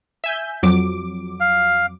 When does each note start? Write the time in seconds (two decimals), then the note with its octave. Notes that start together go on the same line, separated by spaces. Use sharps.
0.24 E5 G#5 G6
0.63 F2 F#3 D6
1.40 F5